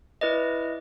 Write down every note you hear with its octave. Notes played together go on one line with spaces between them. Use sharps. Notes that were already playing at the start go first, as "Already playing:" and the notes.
E4 B4 D5 D#5